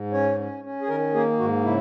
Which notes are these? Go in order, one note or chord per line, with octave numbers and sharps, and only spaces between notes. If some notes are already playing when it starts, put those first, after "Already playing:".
Already playing: G#2
C#4 C#5
C#4
C#4
G#4
D#3 A#4
A#3 G#4
G#2 F#4
C#3 E4